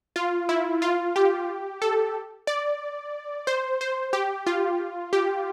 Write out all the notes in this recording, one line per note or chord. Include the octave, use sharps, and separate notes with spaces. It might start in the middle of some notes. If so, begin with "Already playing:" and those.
F4
E4
F4
G4
A4
D5
C5
C5
G4
F4
G4